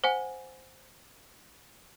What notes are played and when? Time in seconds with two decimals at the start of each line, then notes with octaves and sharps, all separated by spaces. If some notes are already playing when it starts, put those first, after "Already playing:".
0.04 C5 F#5 G#5